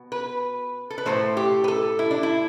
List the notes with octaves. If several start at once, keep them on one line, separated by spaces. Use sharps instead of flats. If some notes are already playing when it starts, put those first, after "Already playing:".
Already playing: B2
B4
A4
B4
A2 F#3 A3 C5
G4
B4
A4
E4
D4
E4